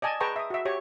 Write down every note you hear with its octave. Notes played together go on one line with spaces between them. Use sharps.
D5 D#5 G#5 A5
G#4 B4 G5 A5 A#5 C#6
E5 D#6
F#4 E5
G4 C#5 C#6